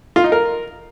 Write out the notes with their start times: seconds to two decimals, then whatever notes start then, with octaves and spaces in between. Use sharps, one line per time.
0.16 F4
0.24 D#4
0.32 A#4